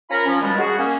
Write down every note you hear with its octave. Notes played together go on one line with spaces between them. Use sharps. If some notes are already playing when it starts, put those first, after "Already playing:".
C#4 F4 A#4 A#5 B5
F3 C#4
B2 D#3 G3 G#3
F#4 G#4
A#3 C#4